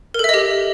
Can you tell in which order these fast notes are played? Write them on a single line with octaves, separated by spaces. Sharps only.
A#4 A4 E5 D#5 G4